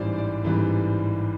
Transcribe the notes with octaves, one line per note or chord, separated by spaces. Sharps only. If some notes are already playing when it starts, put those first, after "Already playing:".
Already playing: A1 G#2 E3 G3 C5 D5
D5
A1 G#2 E3 G3